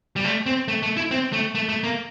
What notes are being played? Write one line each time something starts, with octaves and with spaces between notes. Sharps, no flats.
G3
A3
C4
A3
A3
E4
C4
A3
A3
A3
A#3